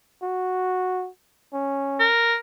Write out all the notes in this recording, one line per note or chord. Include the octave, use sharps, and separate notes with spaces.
F#4
C#4
A#4